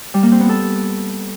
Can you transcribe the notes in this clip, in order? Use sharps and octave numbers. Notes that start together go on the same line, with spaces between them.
G3
A#3
C4
B3
A4